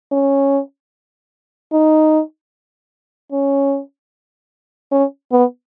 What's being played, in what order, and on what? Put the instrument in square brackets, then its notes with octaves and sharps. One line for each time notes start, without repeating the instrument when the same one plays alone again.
[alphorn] C#4
D#4
C#4
C#4
B3